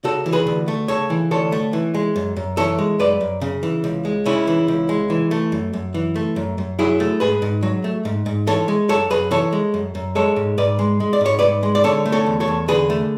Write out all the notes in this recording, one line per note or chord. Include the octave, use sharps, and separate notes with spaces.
C#3 F#4 A4
E3
G#4 B4
D2
A3
C#3 A4 C#5
E3
D2 A4 C#5
A3
E3
G#3
F#2
F#2
E3 A4 C#5
G#3
F#2 B4 D5
F#2
C#3
E3
C#2
G#3
C#3 C#4 E4
E3
C#2
G#3
E3
A3
F#2
F#2
E3
A3
F#2
F#2
F#3 E4 G#4
A3
G#2 G#4 B4
G#2
F#3
A3
G#2
G#2
E3 A4 C#5
G#3
F#2 A4 C#5
F#2 G#4 B4
E3 A4 C#5
G#3
F#2
F#2
G#3 A4 C#5
G#2
G#2 B4 D5
G#3
G#3
D5
G#2 C#5
G#2 B4 D5
G#3
D5
D3 A4 C#5
A3
A4 C#5
E2
A4 C#5
E2
D3 G#4 B4
A3